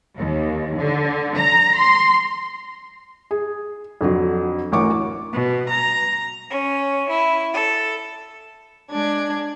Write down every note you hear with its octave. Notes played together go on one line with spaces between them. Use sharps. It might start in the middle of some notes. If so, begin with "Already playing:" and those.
D#2
D3
A#5
C6
G#4
F2 D3 F#3
A1 D2 A#4 C#6 D6
B2
A#5
C#4
E4
A4
G#3 D4 G#6